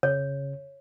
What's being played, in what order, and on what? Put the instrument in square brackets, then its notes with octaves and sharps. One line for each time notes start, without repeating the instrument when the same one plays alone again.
[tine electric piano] C#3 [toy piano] C#5